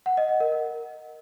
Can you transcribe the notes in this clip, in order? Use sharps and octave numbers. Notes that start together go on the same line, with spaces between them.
F#5
D#5
D#5
A#4
A#4